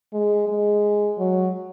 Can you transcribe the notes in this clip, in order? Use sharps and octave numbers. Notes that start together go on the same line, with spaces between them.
G#3
G#3
F#3